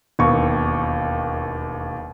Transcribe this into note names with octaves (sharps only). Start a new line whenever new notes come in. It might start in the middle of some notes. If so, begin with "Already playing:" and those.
E1 D#2 C#6